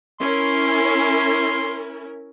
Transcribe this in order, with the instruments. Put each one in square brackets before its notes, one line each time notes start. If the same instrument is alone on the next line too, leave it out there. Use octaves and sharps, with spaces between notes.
[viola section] C#4 E4 A#4 [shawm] C6